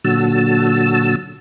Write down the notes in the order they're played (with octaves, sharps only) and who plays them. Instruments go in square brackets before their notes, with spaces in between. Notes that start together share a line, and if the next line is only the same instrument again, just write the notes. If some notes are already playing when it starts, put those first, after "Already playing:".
[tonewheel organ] A#2 D3 F#3 F#4 A5 E6